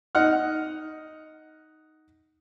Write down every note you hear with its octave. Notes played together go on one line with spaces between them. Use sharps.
D#4 F#5 F6